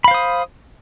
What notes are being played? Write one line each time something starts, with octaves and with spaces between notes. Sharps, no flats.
C5 F5 B5 D#6